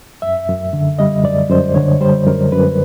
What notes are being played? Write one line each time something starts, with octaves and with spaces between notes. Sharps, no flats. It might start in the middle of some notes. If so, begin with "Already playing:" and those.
F#2 E5
F#2
D3
G3 D#5
F#2 D5
F#2 C5
D3 C#5
G3 C5
F#2 A#4
F#2 B4